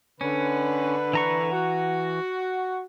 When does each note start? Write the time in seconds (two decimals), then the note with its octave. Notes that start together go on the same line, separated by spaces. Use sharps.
0.21 D3 C#4 B4
1.13 E3 A#5 C#6
1.51 F#4